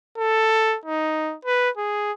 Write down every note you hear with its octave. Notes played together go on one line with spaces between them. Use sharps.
A4
D#4
B4
G#4